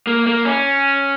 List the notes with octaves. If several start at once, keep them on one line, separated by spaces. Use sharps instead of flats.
A#3
A#3
C#4